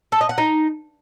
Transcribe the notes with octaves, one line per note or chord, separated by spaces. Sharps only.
A4
D#5
F#5
D#4